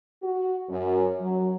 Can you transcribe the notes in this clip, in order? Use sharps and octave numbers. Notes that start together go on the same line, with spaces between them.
F#4
F#2
F#3